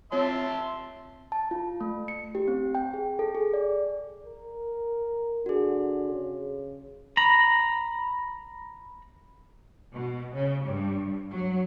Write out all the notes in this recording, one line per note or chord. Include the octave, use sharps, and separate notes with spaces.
C4 F4 C#5 E5 A5 C6
A5
F4
A3
C#7
G4
C4
G5
G#4
A4
G#4
D5
A#4
D3 F#4 G#4
C#3
A#5 B5
B2
C#3
G2
F#3